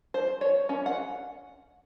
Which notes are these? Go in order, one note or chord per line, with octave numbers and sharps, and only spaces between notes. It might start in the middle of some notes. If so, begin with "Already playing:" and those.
C5
C#5
C#4
F#5